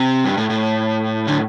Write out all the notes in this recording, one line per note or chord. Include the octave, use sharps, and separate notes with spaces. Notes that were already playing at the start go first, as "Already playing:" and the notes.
Already playing: C3
G2
A2
A2
D3